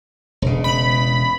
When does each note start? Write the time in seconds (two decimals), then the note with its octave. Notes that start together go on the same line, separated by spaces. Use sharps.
0.42 E1 C#3
0.64 B5